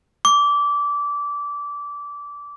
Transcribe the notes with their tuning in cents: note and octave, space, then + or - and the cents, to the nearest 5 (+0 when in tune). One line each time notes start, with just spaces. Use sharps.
D6 -20